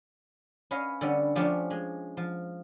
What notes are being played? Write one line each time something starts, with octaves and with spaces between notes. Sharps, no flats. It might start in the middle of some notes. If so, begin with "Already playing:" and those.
C#4 B4 D#5 F5
D3 G3 B3 C#4
F3 A3 C#4 D4 G4 C5
G#3
F3